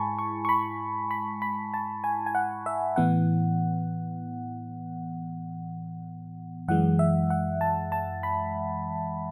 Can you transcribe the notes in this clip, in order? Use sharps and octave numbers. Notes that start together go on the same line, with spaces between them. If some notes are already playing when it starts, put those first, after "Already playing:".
Already playing: G#2 G#3 E4 G#5 A5 B5 C#6
C#6
C#6
B5
B5
B5
A5
G#5
G#5
F#5
E5
A2 E3 B3 F#5
F#2 E3 G#3 F#5
E5
F#5
A5
A5
B5